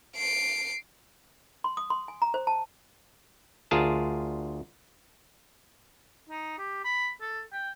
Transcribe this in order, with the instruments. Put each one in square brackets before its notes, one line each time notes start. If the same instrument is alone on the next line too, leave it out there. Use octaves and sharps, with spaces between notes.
[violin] C7 D7
[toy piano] C6
D#6
C6
G#5
A#5
C5
A5
[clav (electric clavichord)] D2 F4 G#4 A#4 A5
[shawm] D#4
G4
B5
A4
G5